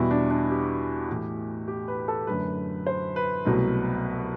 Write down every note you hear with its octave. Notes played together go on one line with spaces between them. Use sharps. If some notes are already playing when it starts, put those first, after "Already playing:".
Already playing: E2 B2 G3 E4
D4
D4
G4
A2 E3 A3
G4
B4
A4
F#2 D3 F#3 A3 B4
C5
B4
C2 B2 F#3 A3